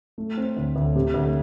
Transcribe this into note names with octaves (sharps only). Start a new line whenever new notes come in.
A3
C4
D2
D2
C3
D2